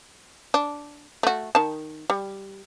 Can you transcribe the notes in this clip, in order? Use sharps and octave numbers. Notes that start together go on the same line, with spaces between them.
D4
A3 F#4
D#3 A5
G3